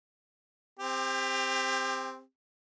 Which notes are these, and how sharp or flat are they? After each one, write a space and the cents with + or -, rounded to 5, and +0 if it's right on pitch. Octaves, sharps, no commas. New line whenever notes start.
C4 +0 G4 +30